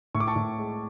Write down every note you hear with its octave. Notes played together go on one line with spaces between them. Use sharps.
A2 C#6
D6
A5 C#6
A2
G#3